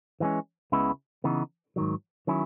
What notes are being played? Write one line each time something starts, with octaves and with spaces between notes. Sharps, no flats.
E3 G#3 C#4
C#2 C#3 G#3 B3 E4
C#3 E3 B3 D#4
G#2 D#3 F#3
D#3 F#3 C#4 E4